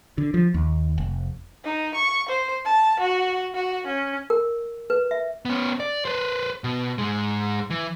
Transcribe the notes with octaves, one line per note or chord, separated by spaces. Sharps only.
D3
F3
D#2
F1
D#4
C#6
C5
A5
F#4
F#4
C#4
A#4
B4
E5
B3 C#4
D5
B4 C5
B2
G#2 G#3
E3